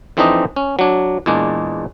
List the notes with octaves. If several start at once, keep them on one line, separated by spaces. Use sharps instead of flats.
F2 E3 C4 D4 D#4 D#5
C#4
F#3 D4
E2 A#2 G#3 D4